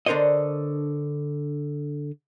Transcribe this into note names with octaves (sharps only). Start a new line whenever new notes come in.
D3 D4 A#4 C5 C#5 D#5